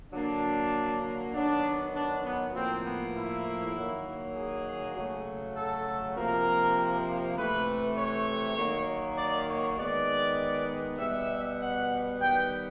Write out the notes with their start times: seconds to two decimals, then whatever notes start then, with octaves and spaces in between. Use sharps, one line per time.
0.12 D3 F#3 A#3 D4
1.33 D#3 F#3 B3 D4
1.94 D4
2.24 B3
2.54 A2 F3 A#3 C4
2.85 B3
3.14 E4
3.75 D#3 F#3 A#3
4.35 G#4
4.95 C#3 F#3 A3
5.55 A4
6.15 C3 F3 A#3 A#4
7.36 C3 E3 A3 B4
7.96 C#5
8.57 D#3 F#3 A#3
9.17 D5
9.48 C#5
9.78 D#3 G#3 B3 D5
10.98 B2 G3 B3 E5
11.59 F#5
12.18 D#3 G3 B3 G5